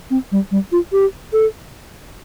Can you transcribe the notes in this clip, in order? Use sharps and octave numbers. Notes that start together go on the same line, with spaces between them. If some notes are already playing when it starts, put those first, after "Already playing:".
C4
G3
G3
F4
G4
A4